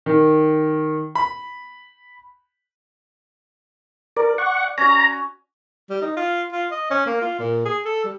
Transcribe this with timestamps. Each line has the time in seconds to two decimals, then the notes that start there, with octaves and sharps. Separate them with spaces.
0.06 D#3
1.15 B5
4.16 A#4 D5
4.38 F#5 C#6
4.78 C#4 F#4 A#5
5.90 G3
6.02 D#4
6.17 F4
6.52 F4
6.71 D#5
6.91 C#4
7.06 A#3
7.22 F4
7.39 A#2
7.65 G#4
7.85 A4
8.05 G3